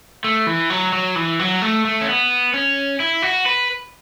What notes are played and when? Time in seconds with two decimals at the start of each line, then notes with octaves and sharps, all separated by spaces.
0.24 A3
0.47 E3
0.70 F#3
0.93 F#3
1.16 E3
1.39 F#3
1.62 A3
1.85 A3
2.01 C#4
2.08 B3
2.54 C#4
3.00 E4
3.22 F#4
3.46 B4